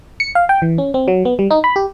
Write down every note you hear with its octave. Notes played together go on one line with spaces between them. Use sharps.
C#7
F5
G5
E3
C#4
C4
F#3
B3
G3
D#4
B5
G4